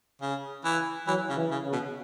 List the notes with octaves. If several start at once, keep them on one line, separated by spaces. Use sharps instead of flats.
C#3
E3
E3 F#3
C#3
E3
C#3
C#3
B2